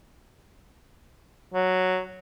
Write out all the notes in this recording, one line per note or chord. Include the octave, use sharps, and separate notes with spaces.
F#3